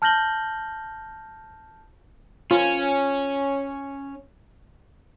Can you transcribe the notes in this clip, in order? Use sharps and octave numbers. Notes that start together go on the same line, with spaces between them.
A5 F6 G6 A#6 F#7 G7
C#4 F4